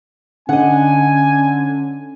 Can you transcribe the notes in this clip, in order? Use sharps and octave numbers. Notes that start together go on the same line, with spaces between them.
D3 C#4 D#5 F#5 G#5